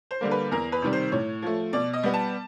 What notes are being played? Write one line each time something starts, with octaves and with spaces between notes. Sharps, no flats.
C5
D3 G3 A#3
B4
E2 A#4
B4
C3 D#3 G3
C5
A2 C#5
F3 A3
B2 D5
D#5
G3 B3
A5